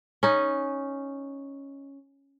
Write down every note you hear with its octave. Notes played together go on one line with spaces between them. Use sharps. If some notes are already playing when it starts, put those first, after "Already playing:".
C#4 D#4